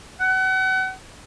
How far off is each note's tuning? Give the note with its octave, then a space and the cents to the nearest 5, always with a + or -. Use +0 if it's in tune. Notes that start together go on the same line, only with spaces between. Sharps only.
F#5 +35